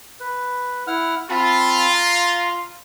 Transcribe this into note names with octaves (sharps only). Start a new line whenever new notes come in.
B4
E4 F#5 F6
C4 F4 A5 B5
F5 A#5